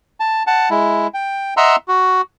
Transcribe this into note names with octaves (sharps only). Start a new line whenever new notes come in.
A5
F#5 A5
G#3 E4
G5
D#5 E5 F#5 A#5 C6 E6
F#4